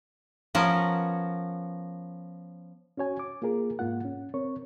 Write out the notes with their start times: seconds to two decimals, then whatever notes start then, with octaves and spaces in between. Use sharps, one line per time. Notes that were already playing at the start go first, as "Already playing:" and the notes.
0.55 F3 B3 C#4 A#4
2.97 C#4 F#4 C#5 G#5
3.19 D6
3.42 A#3 F4 G#4 A#4
3.79 G#2 A#3 F4 F#5
4.05 C#4
4.34 C4 A#4 C#5 C#6